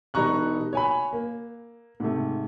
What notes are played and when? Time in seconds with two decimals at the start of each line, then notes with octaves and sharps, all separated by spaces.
0.14 E1 G3 D#4 A#5 C#6 F#6
0.73 C#5 G#5 B5
1.13 A#3
2.00 G#2 C3 A3